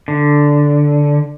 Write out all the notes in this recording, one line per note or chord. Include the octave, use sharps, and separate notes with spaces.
D3